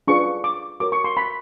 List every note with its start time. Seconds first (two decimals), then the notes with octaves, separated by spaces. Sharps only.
0.08 D4 F4 G#4 B4 C#6
0.44 D6
0.80 F#4 A#4 C#5 D6
0.92 C#6
1.04 C6
1.17 B5